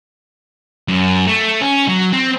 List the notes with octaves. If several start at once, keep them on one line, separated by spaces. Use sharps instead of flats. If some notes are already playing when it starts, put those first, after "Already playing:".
F#2
A3
C#4
F#3
C4